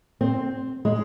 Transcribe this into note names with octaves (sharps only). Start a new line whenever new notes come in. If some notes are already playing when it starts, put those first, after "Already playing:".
C4
G#3